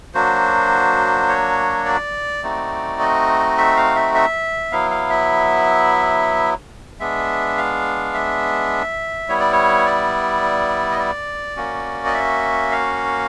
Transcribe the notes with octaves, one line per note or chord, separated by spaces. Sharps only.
F#3 A#3 D4 F#4 C5
C#5
D5
A3 C4 D#4 F#4
D#5
E5
F5
E5
E5
F#3 B3 E4 F5
F5
E5
G#3 B3 D4 E5
F5
E5
G3 B3 E4 C#5
D5
C#5
D5
D#5
D5
A#3 C#4 F#4
D#5
E5
F5